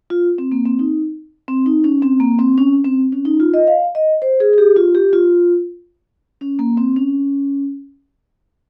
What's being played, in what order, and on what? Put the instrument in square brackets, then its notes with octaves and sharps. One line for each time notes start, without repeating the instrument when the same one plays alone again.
[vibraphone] F4
C4
A#3
C4
D#4
C4
D#4
C#4
C4
A#3
C4
C#4
C4
C#4
D#4
F4
D#5
F5
D#5
C5
G#4
G#4
G4
F4
G4
F4
C#4
A#3
C4
C#4